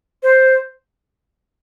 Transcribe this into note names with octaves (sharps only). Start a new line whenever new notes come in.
C5